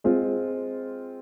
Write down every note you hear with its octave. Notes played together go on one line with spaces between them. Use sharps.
G#3 C4 F4